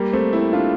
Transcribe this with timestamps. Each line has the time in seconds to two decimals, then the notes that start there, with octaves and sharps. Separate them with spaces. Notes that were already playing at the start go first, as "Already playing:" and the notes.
Already playing: G3 A#3
0.13 A3 C4
0.33 C4 E4
0.53 D4 F4